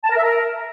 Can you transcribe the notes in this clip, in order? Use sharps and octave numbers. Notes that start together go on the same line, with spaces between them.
A5
A#4
E5
A#4